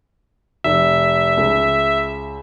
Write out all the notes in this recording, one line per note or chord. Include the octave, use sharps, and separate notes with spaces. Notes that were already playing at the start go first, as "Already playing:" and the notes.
F1 E5
C#2